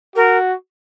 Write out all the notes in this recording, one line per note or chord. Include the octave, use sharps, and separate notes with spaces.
F#4 A#4